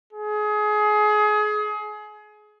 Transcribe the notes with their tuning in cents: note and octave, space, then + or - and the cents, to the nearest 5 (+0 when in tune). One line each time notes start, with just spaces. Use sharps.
G#4 +25